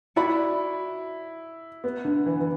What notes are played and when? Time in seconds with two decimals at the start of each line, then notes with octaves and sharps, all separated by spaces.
0.16 E4 F#4 D5 B5
1.84 B3
2.05 D3
2.26 E3
2.40 E3